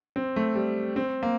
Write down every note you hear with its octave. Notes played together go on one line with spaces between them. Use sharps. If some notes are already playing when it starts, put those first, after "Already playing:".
C4
A3
G3
C4
A#3